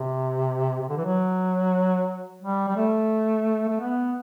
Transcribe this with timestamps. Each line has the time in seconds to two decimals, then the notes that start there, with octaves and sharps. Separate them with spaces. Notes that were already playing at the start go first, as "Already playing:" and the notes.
Already playing: C3
0.81 C3
0.89 D3
0.97 E3
1.05 F#3
2.42 G3
2.69 G3
2.77 A3
3.69 A3
3.80 B3